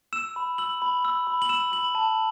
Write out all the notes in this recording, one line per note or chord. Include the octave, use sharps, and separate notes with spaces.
E6 E7
B5
E6 F#7
B5
E6
B5
F#7
E6 E7
B5 F#7
A5